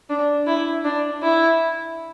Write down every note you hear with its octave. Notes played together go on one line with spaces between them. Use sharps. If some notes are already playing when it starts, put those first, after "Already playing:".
D4
E4
D4
E4